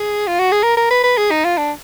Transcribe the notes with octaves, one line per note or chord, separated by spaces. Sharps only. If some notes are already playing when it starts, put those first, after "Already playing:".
Already playing: G#4
F4
F#4
G#4
A#4
A#4
B4
B4
G#4
D#4
F4
D4